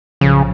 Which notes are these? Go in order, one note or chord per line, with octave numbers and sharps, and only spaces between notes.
B1 A2 C#3 F3